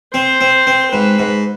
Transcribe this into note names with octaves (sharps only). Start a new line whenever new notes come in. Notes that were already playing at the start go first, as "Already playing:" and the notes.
C4 C5
C4
C4
G#2 B4
G#2